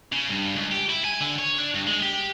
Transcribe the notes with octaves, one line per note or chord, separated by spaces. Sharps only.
C#3
G2
C#2
G4
E4
G#5
D3
C#5
D4
G2
G#3
G4